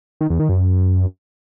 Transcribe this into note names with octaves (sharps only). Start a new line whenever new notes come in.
D#3
E2
D#3
F#2